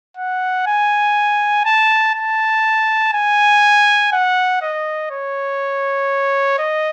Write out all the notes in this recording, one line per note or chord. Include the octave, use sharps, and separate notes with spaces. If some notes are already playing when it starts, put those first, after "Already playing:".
F#5
G#5
A5
A5
G#5
F#5
D#5
C#5
D#5